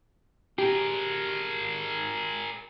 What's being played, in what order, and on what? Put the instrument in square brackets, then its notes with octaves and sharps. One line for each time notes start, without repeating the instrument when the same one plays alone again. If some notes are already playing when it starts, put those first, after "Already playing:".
[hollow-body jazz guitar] G4 [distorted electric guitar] G#4 A#4